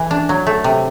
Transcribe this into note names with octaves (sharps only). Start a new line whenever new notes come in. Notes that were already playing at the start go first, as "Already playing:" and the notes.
Already playing: E3
D4
F#3
A3
C3